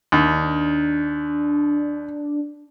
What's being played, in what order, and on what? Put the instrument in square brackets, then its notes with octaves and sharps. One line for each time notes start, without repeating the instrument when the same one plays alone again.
[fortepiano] D#2 [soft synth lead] D4